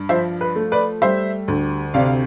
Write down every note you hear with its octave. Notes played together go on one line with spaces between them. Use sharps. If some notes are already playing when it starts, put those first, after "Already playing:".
Already playing: G2
F3 C5 E5
B4
A3
B4 D5
G3 C5 E5
D2
C3 D5 F5